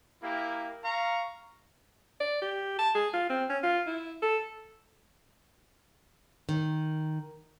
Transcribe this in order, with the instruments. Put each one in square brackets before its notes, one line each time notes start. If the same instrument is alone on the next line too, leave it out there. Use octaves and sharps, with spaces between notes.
[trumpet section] A#3 E4 G4 A#4
F5 A#5 C#6
[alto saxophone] D5
G4
A5
G#4
F4
C4
C#4
F4
E4
A4
[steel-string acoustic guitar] D#3